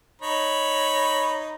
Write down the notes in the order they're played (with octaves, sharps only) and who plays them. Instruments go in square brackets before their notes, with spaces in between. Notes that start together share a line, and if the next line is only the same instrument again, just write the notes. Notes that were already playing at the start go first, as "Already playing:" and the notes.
[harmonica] D#4 C#5 B5